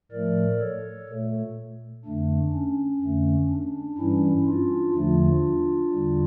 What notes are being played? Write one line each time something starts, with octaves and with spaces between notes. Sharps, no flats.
A2 F3 A3 A#4 D5
A4 C#5
A#2 A3
F2 D3 A3 D4
C#4
F2 D3 A3
D4
G2 E3 G3 C#4 E4
D4 F4
E2 D3 F3 A3 D4 F4
E2 D3 G3